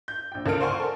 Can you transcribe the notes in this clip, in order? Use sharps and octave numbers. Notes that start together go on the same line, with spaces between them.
G6
A#1 G5
C#2 A#3 A4 A#4 F6 D7
C5 D5 F5 F#5 G#5 C#6
A4 A#4